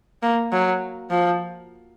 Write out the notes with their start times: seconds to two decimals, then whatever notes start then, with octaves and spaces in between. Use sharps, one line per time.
0.23 A#3
0.52 F#3
1.11 F3